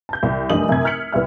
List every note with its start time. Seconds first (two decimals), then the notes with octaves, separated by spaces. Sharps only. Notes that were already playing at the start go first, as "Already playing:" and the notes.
0.09 A5 G6
0.23 C2
0.50 F1 F#2 D4 D#5 D#6 F#7
0.69 F#2 C3 G#6
0.84 E6 F6 G#6 B6 C#7 F#7
1.12 C2 B4 E5 F6